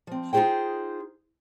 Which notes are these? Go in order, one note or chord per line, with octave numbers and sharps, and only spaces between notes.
F3 C4
D#4 F4 F#4 G#4 C5 G5